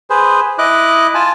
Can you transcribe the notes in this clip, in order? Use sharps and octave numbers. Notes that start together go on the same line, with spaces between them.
G#4 B4 C5
E4 D#5 D6 F#6
F4 G#5 A5